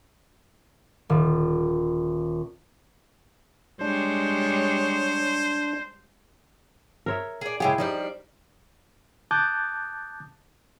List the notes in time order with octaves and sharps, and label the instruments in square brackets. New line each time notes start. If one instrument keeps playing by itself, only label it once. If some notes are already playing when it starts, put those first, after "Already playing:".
[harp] D#1
[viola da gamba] G3 G#3 C#5 [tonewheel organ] D4 [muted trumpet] C5
[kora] A#4 C#5 E5
[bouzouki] G#4 D5
[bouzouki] C#3 G#3 G4 [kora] E4 G#4 [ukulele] G5
[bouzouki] F3 G3 D4 [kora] D#4
[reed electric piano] A5 D6 D#6 F#6 G6 A6